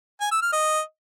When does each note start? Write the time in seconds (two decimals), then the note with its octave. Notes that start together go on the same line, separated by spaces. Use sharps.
0.21 G#5
0.31 E6
0.42 F6
0.52 D#5